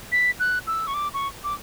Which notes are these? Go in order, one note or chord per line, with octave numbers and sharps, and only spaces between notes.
B6
F#6
E6
C#6
D6
C#6
D6